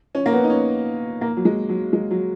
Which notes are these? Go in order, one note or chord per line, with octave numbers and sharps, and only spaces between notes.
C#4
A#3
B3
D#4
C#4
A#3
F#3
G#3
F#3
G#3
F#3